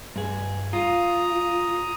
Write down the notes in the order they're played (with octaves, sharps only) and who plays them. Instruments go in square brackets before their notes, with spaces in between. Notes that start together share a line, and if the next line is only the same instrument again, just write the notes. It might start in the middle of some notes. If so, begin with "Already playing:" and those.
[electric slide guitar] G2 G#4
[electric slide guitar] F4 [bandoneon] A#5 D#6